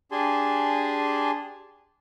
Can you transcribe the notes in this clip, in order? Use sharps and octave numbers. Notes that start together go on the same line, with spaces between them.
D4 G4 G#4 G#5 A5 C6